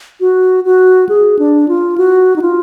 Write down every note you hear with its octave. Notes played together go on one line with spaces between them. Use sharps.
F#4
F#4
G#4
D4
F4
F#4
D#4
F4